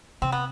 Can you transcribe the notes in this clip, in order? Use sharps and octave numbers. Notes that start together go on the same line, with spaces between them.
C3 C4
B3